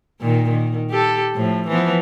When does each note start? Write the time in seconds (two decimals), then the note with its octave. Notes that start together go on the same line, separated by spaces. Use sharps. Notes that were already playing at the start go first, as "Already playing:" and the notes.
0.21 A#2 D#3
0.49 D#3
0.90 G4 A4
1.35 A2 F3
1.68 E3 F3 B3